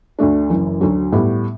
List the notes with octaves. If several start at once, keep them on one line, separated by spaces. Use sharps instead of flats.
D2 D3 A3 D4
F#1 F#2 E3
D2 D3 F#3
A2 G3 B3